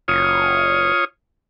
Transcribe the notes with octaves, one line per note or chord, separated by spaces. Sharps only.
F#1 F4 C#5 D#6